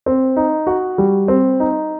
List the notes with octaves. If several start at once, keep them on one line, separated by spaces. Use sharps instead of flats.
C4
D#4
F#4
G3
C4
D#4